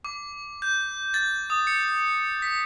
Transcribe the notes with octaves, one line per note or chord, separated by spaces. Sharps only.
D6
G6
A6
D#6
C#7
B6